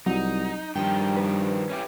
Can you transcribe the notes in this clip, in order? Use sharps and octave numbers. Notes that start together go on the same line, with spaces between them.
C2 F#3 D#4
G2 D#3 F3 G5
B4
C#4 E4 G4